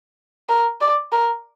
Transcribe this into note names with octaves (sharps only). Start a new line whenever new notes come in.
A#4
D5
A#4